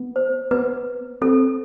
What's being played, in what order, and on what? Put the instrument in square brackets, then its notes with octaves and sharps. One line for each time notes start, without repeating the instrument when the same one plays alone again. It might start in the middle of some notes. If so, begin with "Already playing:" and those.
Already playing: [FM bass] B3
[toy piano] C5
[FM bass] B3 [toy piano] B4
[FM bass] C4 [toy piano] A4